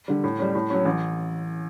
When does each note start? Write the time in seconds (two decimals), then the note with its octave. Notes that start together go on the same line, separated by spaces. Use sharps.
0.08 D3 G3
0.24 A2
0.39 G3 C#4
0.55 A2
0.70 F#3 C#4
0.85 A1